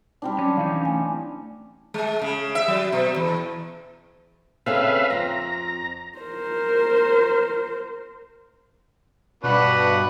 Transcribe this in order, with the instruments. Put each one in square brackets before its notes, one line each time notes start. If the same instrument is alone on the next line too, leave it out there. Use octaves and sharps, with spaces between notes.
[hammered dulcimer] G3 C4 D4 [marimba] D#4
[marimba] F#3 [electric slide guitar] C#4
[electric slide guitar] E3 C#4 D#4 [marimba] F5
[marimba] A3 G#5
[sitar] G#3
C#3
E5
F#3
B2
E2
[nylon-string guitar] C#3 C4 A4 [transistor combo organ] B4 E5 F5
[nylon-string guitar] F2 C4 [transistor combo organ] A#5
[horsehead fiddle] A#4 C5
[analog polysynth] G2 B2 [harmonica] B3 D4 F#4 [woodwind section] B5 [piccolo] F#6